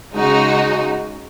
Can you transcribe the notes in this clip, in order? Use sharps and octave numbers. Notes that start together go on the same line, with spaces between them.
C#3 G#3 D#4 F#4